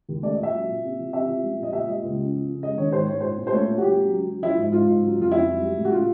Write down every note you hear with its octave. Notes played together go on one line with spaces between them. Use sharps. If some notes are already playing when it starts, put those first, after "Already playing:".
D#2
A3 D5
D#5
A#2 E5
F#3
A#2
C3
F3
C3 E5
F3
G3
A#2 D#5
A#2 E5
G3 D#5
C#2
C#3
F3
C#3
G#3 D#5
D#3 C#5
G#2 C5
G#2 C#5
A#2 C5
A#2
C5
A3 C#5
A#2
F#4
F#3 G4
F#3
F#3
F#3
F3 E4
G#2
G#2 F4
G#2
F#3
F2 F4
F2 E4
F#3
G3
A2
F#4
A2 F4